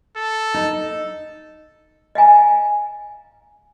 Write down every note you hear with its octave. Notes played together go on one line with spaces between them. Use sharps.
A4
D#4
D#5 F5 G#5 A#5